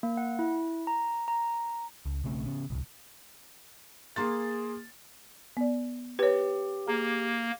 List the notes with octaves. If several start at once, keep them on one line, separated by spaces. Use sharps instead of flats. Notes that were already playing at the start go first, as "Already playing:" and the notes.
A#3
F#5
E4
A#5
A#5
C#2
B1 C#3 A3 C4
C#3 B3 C#4
D1 C2
A#3 G#4 C6 A6
B3 D5
G4 B4 C#5
A#3 G#4 A#5